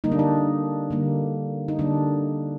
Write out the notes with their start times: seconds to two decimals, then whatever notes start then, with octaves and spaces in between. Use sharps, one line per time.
0.04 D3 G3 A#3 D#4
0.12 D4
0.19 D#4
0.91 D3 G3 A#3
1.68 D#4
1.79 D3 G3 A#3 D4